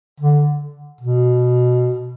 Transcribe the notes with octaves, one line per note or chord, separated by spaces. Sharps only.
D3
B2